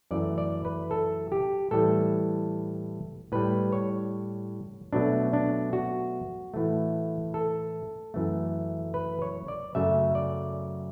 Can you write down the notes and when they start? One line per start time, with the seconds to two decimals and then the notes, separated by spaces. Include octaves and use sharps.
0.11 F#2 E3 A3 D5
0.38 D5
0.65 B4
0.91 A4
1.32 G4
1.71 A2 E3 G3 A4
3.32 A2 G3 B4
3.72 C#5
4.93 B2 F#3 A3 D4
5.33 D4
5.73 F#4
6.54 A2 E3 A3
7.34 A4
8.14 F#2 E3 A3
8.94 B4
9.22 C#5
9.48 D5
9.75 F#2 C#3 F#3 A3 E5
10.15 D5